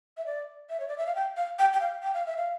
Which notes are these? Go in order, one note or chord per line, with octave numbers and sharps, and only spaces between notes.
E5
D5
E5
C#5
D5
E5
F5
G5
F5
G5
G5
F5
G5
F5
E5
F5